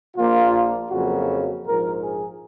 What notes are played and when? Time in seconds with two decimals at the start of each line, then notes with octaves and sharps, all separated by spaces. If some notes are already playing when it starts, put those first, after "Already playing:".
0.16 A#1 A#2 F3 A#3 F4
0.90 F2 C#3 F#3 A#3 F#4
1.65 A#1 G#2 F3 A#4
2.02 G#4